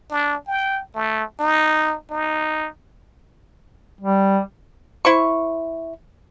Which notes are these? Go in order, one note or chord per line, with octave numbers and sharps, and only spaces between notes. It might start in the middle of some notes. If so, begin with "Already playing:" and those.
D4
G5
A3
D#4
D#4
G3
E4 C5 C#6